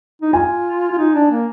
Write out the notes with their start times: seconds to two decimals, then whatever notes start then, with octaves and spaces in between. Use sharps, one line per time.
0.21 D#4
0.33 F4 G#5
0.91 F4
0.98 D#4
1.14 D4
1.31 A#3